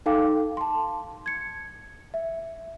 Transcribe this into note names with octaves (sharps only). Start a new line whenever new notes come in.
D#4 A4 F5 G5 D6
A5 C6
G#6 C#7
E5